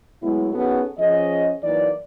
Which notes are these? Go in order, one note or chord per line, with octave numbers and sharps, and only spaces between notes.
A2 F#3 G#3 B3 E4
B3 C#4 D#4 F#4 G#4 A4
F3 C#4 G#4 D#5
E3 F#3 A#3 D#4 D5